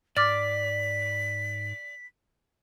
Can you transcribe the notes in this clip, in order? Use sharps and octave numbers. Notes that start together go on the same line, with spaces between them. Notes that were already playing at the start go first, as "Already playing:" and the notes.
G#2 D5 D6 F6 A6 B6